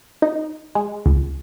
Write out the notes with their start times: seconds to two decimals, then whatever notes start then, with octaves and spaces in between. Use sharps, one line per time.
0.22 D#4
0.75 G#3
1.06 C#2